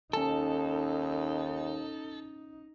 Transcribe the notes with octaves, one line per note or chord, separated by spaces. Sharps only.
D#2 C#4 D#4 A4 A5